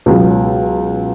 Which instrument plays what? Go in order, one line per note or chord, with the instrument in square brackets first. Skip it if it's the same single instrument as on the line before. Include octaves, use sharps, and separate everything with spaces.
[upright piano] C#2 B2 F#3